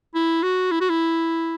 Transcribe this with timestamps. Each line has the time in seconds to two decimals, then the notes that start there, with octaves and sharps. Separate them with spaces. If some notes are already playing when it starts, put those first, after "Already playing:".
0.15 E4
0.43 F#4
0.72 E4
0.81 F#4
0.90 E4